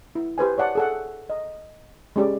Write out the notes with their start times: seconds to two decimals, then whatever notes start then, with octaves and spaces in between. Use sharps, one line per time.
0.15 E4
0.38 G4 B4 C5 G#5
0.58 C#5 D5 F#5 A5
0.75 G#4 A4 F#5
1.30 D#5
2.16 G#3 C#4 G4 D5